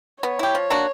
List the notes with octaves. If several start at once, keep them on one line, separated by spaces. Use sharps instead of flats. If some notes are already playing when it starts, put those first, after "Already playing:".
B3 C#5
E4 G4
F3
A#3 D4 F#4